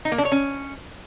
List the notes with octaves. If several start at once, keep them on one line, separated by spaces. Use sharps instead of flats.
D#4
A#3
D4
C#5
C#4